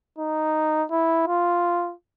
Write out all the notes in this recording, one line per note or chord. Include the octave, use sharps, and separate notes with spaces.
D#4
E4
F4